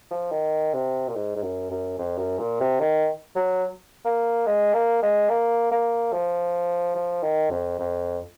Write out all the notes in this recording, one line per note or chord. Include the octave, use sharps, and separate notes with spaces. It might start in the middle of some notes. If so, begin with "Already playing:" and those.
F3
D#3
C3
A#2
G#2
G#2
F#2
F#2
F2
F#2
A#2
C3
D#3
F#3
A#3
G#3
A#3
G#3
A#3
A#3
F3
F3
D#3
F2
F2